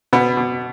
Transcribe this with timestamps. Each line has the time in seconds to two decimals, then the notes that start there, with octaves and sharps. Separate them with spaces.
0.13 B2 B3
0.37 B2